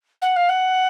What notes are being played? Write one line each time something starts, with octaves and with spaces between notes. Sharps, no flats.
F#5
F5
F#5